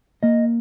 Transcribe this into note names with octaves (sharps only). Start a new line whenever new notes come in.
A#3 D#5